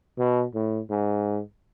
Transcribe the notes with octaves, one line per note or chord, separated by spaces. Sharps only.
B2
A2
G#2